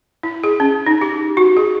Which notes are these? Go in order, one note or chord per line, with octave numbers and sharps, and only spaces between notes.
E4
G#4
C#4
D#4
G4
F#4
G#4